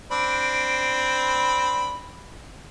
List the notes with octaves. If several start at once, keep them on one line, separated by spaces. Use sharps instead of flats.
C4 D4 B5